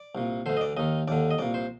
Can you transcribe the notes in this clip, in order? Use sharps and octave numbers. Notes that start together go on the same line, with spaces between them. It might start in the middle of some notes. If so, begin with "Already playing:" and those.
Already playing: D5
C2 A#2
D2 D3 C5
D#5
D5
D#2 D#3 D#5
D#2 D3 D5
D#5
C2 A#2 D5
C5